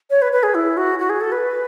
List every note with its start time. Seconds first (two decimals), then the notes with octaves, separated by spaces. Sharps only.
0.10 C#5
0.22 B4
0.33 B4
0.43 G#4
0.55 E4
0.77 F#4
0.99 F#4
1.10 G#4
1.21 A4
1.32 B4